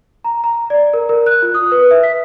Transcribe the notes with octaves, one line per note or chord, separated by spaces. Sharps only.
A#5
A#5
D5
A#4
A#4
F#6
F4
D#6
B4
E5
B6